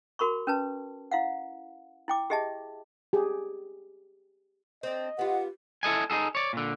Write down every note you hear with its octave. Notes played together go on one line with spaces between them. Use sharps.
F#4 A#4 B5 C#6
C#4 B4 A5
E4 F5 F#5
E4 G5 D6
G4 G#4 D#5 E5 A5
G4 G#4
C4 D4 D#5
B3 F4 G4 F#5
E4 A4 D#5 G#5
D#4 F4 G#4 A4
C#5 D5
A#2 D3